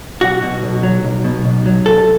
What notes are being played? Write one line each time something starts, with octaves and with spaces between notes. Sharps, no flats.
B1 F#4
B2
B1
F#3
B1
B2
B1
F#3
C2 A4